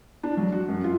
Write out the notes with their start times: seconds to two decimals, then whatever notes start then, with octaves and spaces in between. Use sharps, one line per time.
0.23 D4
0.37 F#3
0.52 F#4
0.68 F#2
0.84 F4